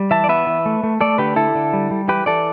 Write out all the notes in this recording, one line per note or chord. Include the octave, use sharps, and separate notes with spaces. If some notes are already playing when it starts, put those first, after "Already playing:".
Already playing: G3
E3 E5 A5
D5
B3 B4 E5
E3
A3
A3
A3 A4 D5
D3 G4 B4
D3 E4 A4
D3
G3
G3
E3 G4 B4
E3 A4 D5